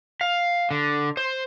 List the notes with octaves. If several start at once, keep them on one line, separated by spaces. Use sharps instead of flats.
F5
D3
C5